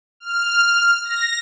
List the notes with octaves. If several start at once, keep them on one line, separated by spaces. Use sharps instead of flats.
F6
A#6